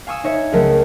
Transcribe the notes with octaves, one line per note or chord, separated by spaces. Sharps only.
F5 G#5 C#6 D#6 E6
D#4 C#5 E5
C#2 F#3 A3 A#4